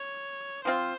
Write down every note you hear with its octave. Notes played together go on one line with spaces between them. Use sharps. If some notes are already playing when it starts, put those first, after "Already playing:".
Already playing: C#5
F3 C4 F4 C5